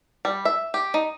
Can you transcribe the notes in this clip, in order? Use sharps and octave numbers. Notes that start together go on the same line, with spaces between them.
G3
E5
G4
D#4